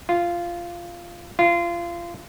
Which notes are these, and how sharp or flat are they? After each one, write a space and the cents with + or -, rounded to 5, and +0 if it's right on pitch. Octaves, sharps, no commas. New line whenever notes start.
F4 -10
F4 -25